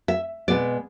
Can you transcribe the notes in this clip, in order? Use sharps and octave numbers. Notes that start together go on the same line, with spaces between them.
E5
B2 G#3 B3 D5